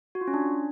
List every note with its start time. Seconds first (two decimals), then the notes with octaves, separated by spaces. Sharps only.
0.15 F#4
0.21 F4
0.27 C#4
0.34 D4